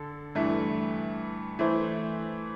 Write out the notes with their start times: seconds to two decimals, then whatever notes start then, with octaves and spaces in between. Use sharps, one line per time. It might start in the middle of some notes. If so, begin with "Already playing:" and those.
Already playing: D3 A4
0.35 G2 E3 A3
1.59 E3 A3 E4 C5